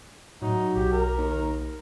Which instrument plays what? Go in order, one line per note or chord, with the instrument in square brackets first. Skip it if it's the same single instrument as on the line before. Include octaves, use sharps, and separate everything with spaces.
[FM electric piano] A2 [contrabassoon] F#3 [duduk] D#4
[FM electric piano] B1 [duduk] G4
[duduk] A#4
[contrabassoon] D#2